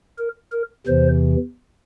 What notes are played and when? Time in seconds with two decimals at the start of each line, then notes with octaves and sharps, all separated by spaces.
0.18 A#4
0.52 A#4
0.87 E2 C3 E3 C5